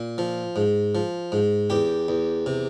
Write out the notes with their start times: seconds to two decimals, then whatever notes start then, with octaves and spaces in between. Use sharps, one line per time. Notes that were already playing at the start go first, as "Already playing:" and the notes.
Already playing: A#2
0.18 F3
0.56 G#2
0.95 F3
1.32 G#2
1.70 E2 G4
2.08 E2
2.46 C3